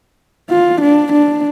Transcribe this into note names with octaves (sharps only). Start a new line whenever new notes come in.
F4
D4
D4